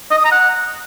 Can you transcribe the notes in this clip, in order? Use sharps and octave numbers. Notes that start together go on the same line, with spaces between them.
D#5
D#6
A#5
F#5